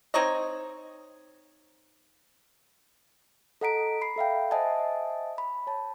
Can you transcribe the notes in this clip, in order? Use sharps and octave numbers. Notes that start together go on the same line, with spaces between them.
C4 D#4 C#5 D#5
A4 D#5 F#5 A#5 B6 D7
B5 C7
A4 E5 F5 G5
C5 D#5 E5 F#5 G#5 A5
B5
C#5 A5